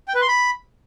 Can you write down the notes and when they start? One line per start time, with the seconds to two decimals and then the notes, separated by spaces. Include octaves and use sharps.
0.08 G5
0.15 B4
0.21 C6
0.28 B5